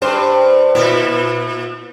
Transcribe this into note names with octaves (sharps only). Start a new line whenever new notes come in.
G2 C5
A#2 E4